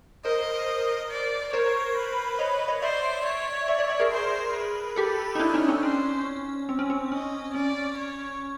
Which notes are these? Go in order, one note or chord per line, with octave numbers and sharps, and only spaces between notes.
A#4 C5 D#5
D5
A#4 C5 C#5
B4
C#5 D#5
C#5 D#5
C5 D5 E5
C#5
D5 E5
D5 E5
D5 E5
G#4 A#4
C5
B4
G4 A4
D#4
D4 E4
C#4 D#4
C4 D4
C#4 C5
C4
C#4
C4
C#4 D#5
C#4 D5
C#5